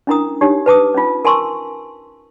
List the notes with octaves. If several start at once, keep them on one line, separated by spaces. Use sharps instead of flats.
C#4 D4 E4 A#4 A#5 D#6
D4 D#4 G4 C#5
B4 A5 D6 D#6
C#4 D#4 F4
A#4 G#5 A5 C6 C#6 E6